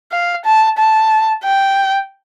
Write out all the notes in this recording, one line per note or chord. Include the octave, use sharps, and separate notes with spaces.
F5
A5
A5
G5